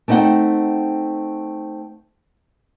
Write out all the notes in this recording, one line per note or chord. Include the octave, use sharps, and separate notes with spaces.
A3 C4 D#4 F#4 F#5 G5